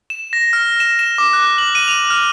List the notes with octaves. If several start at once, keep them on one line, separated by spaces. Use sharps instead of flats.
E7
A#6
F6
E7
E7
D6
F#6
F#7
D#7
F7
F6